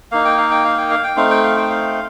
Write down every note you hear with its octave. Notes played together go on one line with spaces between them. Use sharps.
A#3 D#4 F5
G5
F5
G5
F5
G5
F5
G5
A3 C4 D#4 F5
G5
F5
G5
F5